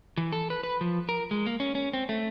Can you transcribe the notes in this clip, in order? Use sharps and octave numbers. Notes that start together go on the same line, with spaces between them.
E3
A4
B4
B4
F3
A#4
G#3
A#3
C#4
C#4
C4
A3